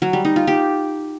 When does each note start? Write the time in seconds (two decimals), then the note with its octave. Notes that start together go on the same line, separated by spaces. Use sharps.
0.02 F#3
0.13 G3
0.25 D#4
0.36 F4
0.47 G4